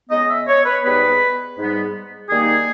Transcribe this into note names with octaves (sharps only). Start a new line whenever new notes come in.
C#3 G#3 B3 D#5
E5
C#5
B4
G#2 G3 B3 B4
G#2 G3 B3
D#3 G3 A#3 D#4 G#4